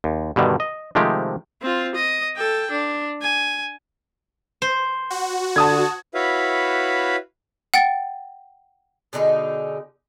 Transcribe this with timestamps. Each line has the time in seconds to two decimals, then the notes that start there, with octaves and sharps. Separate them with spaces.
0.04 D#2
0.36 G2 B2 D3 D#3
0.60 D#5
0.95 C3 D#3 F3 G#3 A3 G4
1.62 C4 F4
1.95 D#5
2.36 A4 G5
2.71 D4
3.21 G#5
4.62 C5
5.10 F#4
5.56 D3 A5 D#6 G#6
6.14 E4 F#4 B4 C#5 E5 F5
7.74 F#5 G5 A6
9.13 B2 D3 D#4 G#4